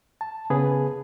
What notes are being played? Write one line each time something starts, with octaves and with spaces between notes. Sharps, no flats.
A5
C#3 B3 G#4 B4